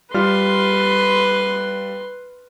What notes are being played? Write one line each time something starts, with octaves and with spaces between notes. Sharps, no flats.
G3 F4 B4 C6 F6